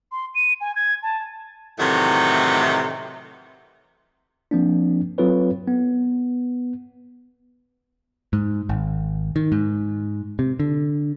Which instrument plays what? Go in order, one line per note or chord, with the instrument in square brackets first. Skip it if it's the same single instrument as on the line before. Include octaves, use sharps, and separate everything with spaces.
[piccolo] C6
D#7
G#5
G#6
A5
[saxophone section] A2 C3 D#3 E3 F#3 A3
[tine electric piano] F3 A#3 C4 D4
F#3 C4 F4 A4 B4 C#5
B3
[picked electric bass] G#2
G#1
D#3
G#2
C3
D3